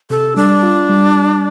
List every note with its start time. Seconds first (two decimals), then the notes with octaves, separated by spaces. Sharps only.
0.10 C3 A4
0.36 G3 D4
0.63 F4
0.89 G3
1.15 G3